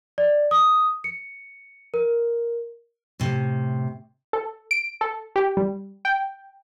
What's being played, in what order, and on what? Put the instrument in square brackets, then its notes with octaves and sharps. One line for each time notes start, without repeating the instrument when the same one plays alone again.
[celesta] D5
D#6
C#7
A#4
[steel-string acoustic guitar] A2 C3
[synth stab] A4
D7
A4
G4
G3
G5